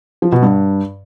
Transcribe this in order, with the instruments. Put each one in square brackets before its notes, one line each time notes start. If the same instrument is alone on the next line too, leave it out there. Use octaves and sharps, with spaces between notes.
[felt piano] F3
B2
G2